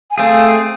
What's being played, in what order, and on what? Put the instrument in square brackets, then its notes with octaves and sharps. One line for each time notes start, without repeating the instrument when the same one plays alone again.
[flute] G#5
[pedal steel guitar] A3 C4 G#4 [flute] F5